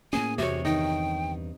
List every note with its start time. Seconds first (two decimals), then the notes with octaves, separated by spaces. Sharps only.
0.13 A2 A#3 C#4 G#4 G#5
0.38 E2 G2 C3 F#4 C#5
0.65 D#3 D#4 G5